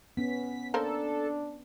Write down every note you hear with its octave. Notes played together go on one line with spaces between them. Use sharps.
B3 C#4 B6
A#3 D4 A4 A#4 C5